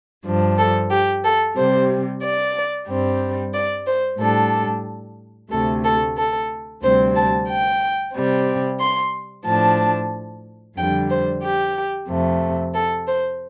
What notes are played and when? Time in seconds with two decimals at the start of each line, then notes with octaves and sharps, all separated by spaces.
0.25 G2 F3 D4
0.58 A4
0.90 G4
1.23 A4
1.56 C3 G3 C4 C5
2.22 D5
2.87 G2 G3 C4
3.53 D5
3.86 C5
4.19 A2 G3 D4 A4
5.50 D2 C3 A3 A4
5.84 A4
6.16 A4
6.82 D2 C3 G3 C4 C5
7.15 A5
7.48 G5
8.13 C3 G3 C4
8.79 C6
9.45 A2 F3 D4 A5
10.76 F2 D3 G3 G5
11.09 C5
11.42 G4
12.08 F2 C3 A3
12.74 A4
13.07 C5